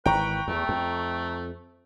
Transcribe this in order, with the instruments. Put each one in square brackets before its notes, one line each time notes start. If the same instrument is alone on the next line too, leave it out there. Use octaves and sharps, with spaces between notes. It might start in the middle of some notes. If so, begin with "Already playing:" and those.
[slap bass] G#1 E3 [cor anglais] B4 [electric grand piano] G5 A#5 C#6
[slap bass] E2 [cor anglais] A3
[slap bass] F2